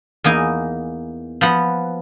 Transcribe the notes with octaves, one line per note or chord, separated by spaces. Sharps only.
E2 A#3 D#4 G#5
F3 B3 F#5